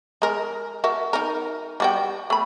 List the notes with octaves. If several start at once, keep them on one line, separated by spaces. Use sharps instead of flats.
G#3 A#4
F#4 A#4 E5
D#4 A#4
G3 F#4 G5
A3 B5